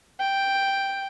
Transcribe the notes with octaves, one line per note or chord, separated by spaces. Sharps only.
G5